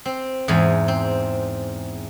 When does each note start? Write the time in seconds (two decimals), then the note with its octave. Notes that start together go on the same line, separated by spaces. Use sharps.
0.05 C4
0.48 E2 G#2 G#5 B5
0.88 C4